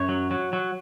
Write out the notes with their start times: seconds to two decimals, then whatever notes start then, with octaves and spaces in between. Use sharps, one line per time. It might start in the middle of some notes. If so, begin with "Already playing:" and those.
Already playing: F#2 C#5
0.09 F#3
0.31 F#3
0.53 F#3